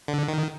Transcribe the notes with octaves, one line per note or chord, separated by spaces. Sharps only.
D3
D#3